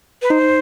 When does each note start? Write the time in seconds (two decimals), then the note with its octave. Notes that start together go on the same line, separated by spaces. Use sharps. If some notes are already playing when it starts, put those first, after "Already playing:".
0.22 B4
0.30 D#4 C5